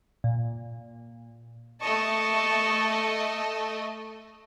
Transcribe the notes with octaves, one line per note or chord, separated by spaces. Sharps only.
A#2
A3 D#5 A5 C#6